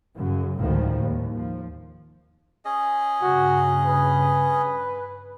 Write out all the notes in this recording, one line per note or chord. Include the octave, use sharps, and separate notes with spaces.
F#2 C#3
G#1 D2 A2 D#3 F3 G3
D#2
F3
C#4 G#4 D#5
G2 C#3 F#4
B4